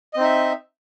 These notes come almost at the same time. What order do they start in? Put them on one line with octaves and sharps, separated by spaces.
D#5 C4 D#4 E5